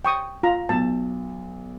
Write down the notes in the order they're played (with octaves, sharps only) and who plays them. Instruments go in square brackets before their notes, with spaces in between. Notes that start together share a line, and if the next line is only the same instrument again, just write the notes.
[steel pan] G5 C#6 D#6
F4 A#5
[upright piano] B1 [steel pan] A5